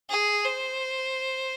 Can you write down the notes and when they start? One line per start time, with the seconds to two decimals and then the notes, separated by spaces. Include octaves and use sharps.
0.09 G#4
0.45 C5